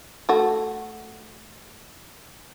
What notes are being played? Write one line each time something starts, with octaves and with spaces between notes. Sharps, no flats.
A3 F#4